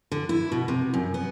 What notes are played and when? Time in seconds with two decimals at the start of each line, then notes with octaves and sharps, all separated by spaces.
0.12 D3
0.29 E4
0.52 B2
0.68 C3
0.94 F#2
1.14 B3